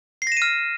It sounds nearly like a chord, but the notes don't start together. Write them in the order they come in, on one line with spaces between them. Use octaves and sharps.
C7 A#6 E7 D#7 F6